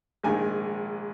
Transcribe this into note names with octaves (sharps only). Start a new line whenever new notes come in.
A#1 G#2 D#3 G#3 G#5